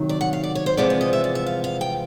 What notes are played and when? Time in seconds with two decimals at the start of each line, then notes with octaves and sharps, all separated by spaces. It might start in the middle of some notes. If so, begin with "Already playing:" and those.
Already playing: C3 D#3 F#3
0.09 D5
0.21 F#5
0.33 F5
0.43 D5
0.55 C#5
0.66 C5
0.77 E2 C3 F3 G#3 B3 D5
0.90 D5
1.01 D#5
1.13 E5
1.24 D5
1.35 E5
1.46 F5
1.64 F5
1.81 G5